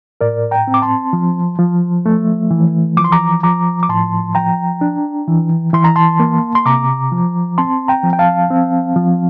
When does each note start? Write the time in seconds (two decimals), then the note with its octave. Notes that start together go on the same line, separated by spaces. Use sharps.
0.21 A2 A#4 D5
0.51 G5 A#5
0.67 C4
0.74 D6
0.82 A5 C6
1.13 F3
1.58 F3
2.06 A3
2.51 E3
2.97 F3 D6
3.04 C6
3.12 A#5 D6
3.43 F3 A#5 D6
3.83 D6
3.89 A2 A5 C6
4.35 F3 G5 A#5
4.81 D4
5.28 E3
5.73 E3 C6
5.84 A#5
5.96 A5 C6
6.20 A#3
6.55 C6
6.66 C3 A#5 D6
7.12 F3
7.58 C4 A5 C6
7.88 G5 A#5
8.03 F3
8.13 G5
8.19 F5 A5
8.50 C4
8.96 F3